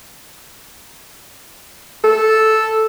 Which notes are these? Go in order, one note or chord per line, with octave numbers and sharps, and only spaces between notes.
A4